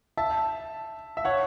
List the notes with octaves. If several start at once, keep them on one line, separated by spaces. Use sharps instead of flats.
E5 A5
E5
C#5 F#5